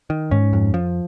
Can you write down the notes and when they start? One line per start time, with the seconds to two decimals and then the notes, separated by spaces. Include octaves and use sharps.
0.10 D#3
0.31 G#2 C#4
0.53 F2
0.74 F3